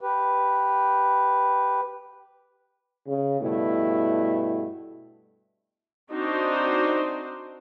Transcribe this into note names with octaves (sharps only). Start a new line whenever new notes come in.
G4 B4
C#3
G2 B2 A3 E4
C4 D4 D#4 F#4 C5